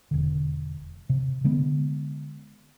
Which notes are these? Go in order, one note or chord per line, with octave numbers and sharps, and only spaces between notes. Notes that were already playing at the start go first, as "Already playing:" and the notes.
E1 D3
C3
D3 G#3 B3